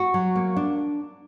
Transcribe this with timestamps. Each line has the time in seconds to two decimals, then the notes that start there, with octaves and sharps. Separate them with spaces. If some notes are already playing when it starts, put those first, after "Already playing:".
Already playing: F#4
0.14 F#3
0.36 A#3
0.57 D4